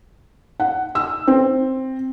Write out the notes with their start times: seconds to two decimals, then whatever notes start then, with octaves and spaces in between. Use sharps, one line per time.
0.60 F#5
0.95 E6
1.28 C4